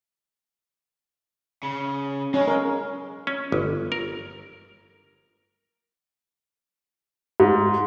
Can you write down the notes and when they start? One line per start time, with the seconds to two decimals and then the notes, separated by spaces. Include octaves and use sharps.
1.63 C#3
2.34 G#3 C#4
2.48 A#4
3.27 C#4
3.52 G1
3.92 A#4
7.40 G#2